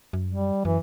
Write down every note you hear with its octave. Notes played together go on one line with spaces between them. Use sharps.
F#2
G3
F#2 E3